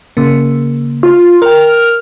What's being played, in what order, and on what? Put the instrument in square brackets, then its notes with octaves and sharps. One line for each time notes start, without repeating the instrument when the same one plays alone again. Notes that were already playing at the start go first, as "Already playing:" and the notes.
[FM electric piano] C#3 A#3
[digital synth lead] F4
[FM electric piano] A#4 G5 [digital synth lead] F6